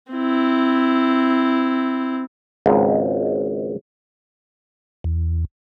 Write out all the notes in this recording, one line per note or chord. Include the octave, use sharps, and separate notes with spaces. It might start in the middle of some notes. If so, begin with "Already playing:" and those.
C4 E4
G#1 C#2 G#2
E2